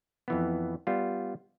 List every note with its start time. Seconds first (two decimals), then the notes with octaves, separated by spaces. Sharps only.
0.28 F2 E3 B3
0.87 G3 B3 F4